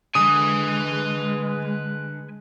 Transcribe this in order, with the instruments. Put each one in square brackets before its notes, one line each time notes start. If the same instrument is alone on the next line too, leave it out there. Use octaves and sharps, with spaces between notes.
[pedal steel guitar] D3 [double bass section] G#3 [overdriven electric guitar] B4 G#5 [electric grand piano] D#6